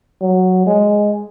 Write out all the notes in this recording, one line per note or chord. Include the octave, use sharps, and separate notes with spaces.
F#3
G#3